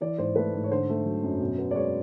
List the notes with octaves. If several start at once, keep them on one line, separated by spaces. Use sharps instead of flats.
E3 D5
G#2 C5
A3 B4
G#2
C#5
D3 C5
A3
F#3
F#2
B2
B3
D5
G#3 C#5